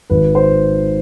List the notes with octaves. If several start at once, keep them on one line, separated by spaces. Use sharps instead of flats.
G#1 B4
C5